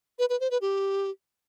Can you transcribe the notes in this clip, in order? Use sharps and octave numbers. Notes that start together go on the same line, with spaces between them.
B4
B4
C5
B4
G4